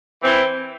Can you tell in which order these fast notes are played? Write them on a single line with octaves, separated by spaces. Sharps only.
E3 C4 E4